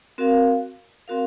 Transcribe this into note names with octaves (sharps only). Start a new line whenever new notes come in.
C4 F#4 A#4 F5
C4 F#4 A#4 F5